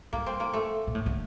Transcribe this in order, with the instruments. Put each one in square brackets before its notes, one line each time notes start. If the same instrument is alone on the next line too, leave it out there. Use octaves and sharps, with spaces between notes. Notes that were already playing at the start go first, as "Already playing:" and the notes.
[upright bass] G2 [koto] A#3
[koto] C4
A#3
A3
[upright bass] A#2
A2
D3